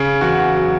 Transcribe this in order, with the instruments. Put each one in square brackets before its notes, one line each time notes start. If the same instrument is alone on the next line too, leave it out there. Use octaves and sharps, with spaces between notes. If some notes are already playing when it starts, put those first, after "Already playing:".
Already playing: [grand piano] C#3
E2 F#4
F#3